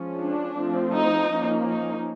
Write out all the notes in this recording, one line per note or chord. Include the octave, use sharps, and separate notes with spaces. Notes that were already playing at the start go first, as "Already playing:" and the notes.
Already playing: F3 G#3 C#4
D4
F3 A3 C4
D#4
F3 A#3 C#4
D#4